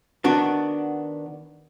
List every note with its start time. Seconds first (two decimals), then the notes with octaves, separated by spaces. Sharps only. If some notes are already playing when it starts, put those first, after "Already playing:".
0.24 D#3 B3 D4 F#4